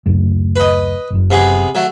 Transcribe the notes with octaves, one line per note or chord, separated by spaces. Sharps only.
D1 C#2 F#2
B4 D#5
F#1 F#2
C3 B3 G#4
F#3 A3